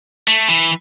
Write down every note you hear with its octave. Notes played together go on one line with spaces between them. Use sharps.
A3
E3